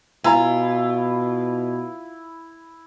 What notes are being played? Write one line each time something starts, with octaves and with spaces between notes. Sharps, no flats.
B2 E4 F4 G#5 A#5